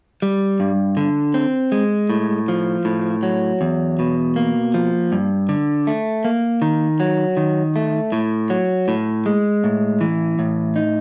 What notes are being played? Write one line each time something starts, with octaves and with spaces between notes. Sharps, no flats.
G3
G2
D3
C4
G#3
A2
F3
A2
F#3
E2
B2
A#3
F3
G2
D3
A3
A#3
D#3
F#3
D#3
A3
A2
F#3
A2
G#3
A2
E3
A2
D#4